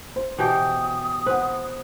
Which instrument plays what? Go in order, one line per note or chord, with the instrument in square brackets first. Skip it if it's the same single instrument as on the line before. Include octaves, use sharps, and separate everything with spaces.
[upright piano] C5
[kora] B2 E3 G4 [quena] D#6
[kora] B4 [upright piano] C5 F#5